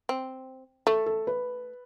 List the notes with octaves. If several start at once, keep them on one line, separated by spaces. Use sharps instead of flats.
C4
A3 A4
A4
B4